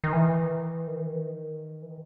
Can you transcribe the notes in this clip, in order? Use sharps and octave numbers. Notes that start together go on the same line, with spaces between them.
D#3
E3
D#3
E3
D#3
E3
D#3